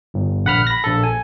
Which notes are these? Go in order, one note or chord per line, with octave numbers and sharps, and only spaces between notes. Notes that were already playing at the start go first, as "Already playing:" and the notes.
G1
A#1 F#5 B5 F6
B5 A#6
A#1 A4
G#5